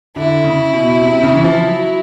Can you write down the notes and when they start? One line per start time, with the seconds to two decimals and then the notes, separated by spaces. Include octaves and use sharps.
0.16 D3 E4
0.44 C#3
0.73 B2
1.02 C3
1.13 C3
1.23 C#3
1.34 E3
1.44 F3
1.66 F#3